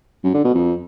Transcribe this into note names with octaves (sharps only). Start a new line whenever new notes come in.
F#2
D3
B2
F2